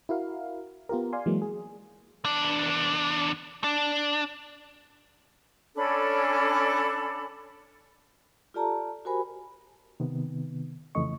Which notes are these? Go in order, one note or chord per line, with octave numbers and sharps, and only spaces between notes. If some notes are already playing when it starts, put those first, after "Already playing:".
E4 F#4 A#4 F5
B3 F4 G4 A#4
D5 F5 G#5 C6
E3 F#3 G#3 A#3
G#4
E2 D4
D4
C#4 D4 A4 B5
F4 G4 A4 D5 A5 A#5
F#4 G4 A#4 C5 G#5 B5
C3 D#3 B3
F2 C#3 E3 A3 D#5 C#6